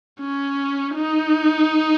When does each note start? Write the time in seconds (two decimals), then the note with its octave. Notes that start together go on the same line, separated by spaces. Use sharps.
0.20 C#4
0.96 D#4